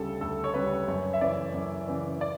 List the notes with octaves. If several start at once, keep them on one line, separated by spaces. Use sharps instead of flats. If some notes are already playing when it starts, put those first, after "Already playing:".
Already playing: D2 C#3 G3 A4
D2 A4
C#5
C#3 G3 B4
F#2 C#5
E5
C#3 E3 D5
F#2
C#3 E3
D5